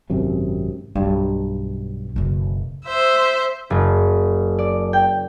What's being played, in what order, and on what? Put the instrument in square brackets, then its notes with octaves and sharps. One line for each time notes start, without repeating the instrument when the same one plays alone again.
[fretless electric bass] G#1 F#2 C3
[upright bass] B1 [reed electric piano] G2
[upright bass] F#1 B1
[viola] C5 E5
[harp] F#1
D5
G5